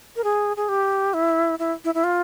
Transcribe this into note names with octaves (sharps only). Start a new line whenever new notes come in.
A#4
G#4
G#4
G4
E4
E4
E4
E4
F4